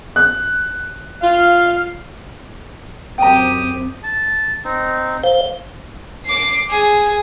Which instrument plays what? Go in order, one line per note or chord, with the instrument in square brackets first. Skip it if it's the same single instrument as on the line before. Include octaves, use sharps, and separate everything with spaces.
[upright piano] F#6
[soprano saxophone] F4 [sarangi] F5
[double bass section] F#2 C4 [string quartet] G4 D#6 [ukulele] G5 A#5
[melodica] A5
C4 D#4
[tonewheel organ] C5 F5
[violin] D6 C7
G#4